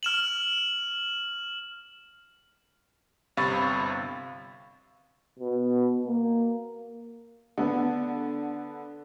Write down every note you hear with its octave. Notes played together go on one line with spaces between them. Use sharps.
F6 E7 F#7
G1 C3 F5 B5 C#6 A6
B2
A#3
D3 B3